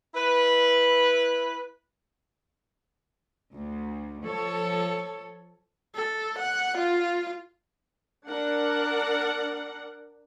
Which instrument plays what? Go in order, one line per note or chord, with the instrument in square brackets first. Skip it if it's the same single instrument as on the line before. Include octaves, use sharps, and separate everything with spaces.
[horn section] E4 B4
[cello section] D2
F3 A4 C#5
[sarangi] A4
F#5
F4
[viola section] D4 A#4 F#5